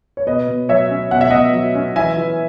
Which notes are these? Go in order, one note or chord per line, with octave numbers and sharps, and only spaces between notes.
C#5
B2 B4 D#5
B2
F#3 C#5 E5
C#4
B2 F#5
E5
B2 D#5 F#5
F#3
C#4
E3 E5 G#5
E3